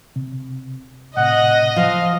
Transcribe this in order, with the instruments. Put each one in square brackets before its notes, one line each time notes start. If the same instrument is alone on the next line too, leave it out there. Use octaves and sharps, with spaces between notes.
[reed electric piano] C3
[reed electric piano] A2 C3 [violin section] D#5 [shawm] F#5
[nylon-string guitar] F3 [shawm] F5